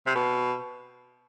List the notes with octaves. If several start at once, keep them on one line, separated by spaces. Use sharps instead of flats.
C3
B2